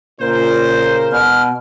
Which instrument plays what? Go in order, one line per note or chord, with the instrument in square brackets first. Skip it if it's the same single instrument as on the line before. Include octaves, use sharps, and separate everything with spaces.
[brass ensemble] A#2 C#3 [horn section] A#4 C5
[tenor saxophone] B2 [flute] F6